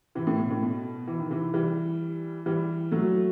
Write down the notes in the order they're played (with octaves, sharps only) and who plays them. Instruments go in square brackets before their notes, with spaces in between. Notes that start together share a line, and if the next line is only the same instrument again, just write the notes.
[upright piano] C3 E3
A2 C3
B2
A2
B2
E3
D#3
C3 E3
E3 G3
E3 G3
F#3 A3